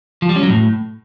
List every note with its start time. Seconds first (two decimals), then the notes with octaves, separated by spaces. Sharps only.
0.22 F3
0.29 G3
0.36 C#4
0.43 F#3
0.50 A2